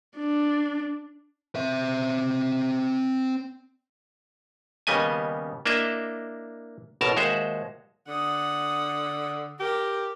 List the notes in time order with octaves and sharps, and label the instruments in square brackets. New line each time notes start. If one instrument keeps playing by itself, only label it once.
[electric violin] D4
[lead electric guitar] C4 E5
[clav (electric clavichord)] D#2 C#3 G3 B3 D#5 G#5
A#3 D4 E4 D#5 E5
A1 B2 A#4 A5
D#2 G#3 F#4 C5 E5
[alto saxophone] D3 [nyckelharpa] F#5 D#6
[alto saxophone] G4 [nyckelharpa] A#4